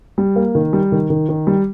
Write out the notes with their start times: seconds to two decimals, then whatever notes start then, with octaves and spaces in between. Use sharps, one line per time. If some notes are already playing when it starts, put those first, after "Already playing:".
0.18 G3
0.36 A#3
0.55 D#3
0.73 G3
0.92 D#3
1.10 D#3
1.29 D#3
1.47 G3